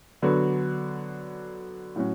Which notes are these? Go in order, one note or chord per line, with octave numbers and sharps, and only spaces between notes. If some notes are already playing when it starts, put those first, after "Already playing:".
D3 F#3 B3 F#4
A2 F#3 C#4 F#4